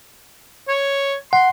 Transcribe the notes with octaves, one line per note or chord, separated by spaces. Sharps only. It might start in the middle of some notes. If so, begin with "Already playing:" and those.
C#5
F#5 C6